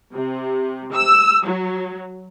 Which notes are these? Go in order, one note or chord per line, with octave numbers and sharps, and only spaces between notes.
C3
E6
F#3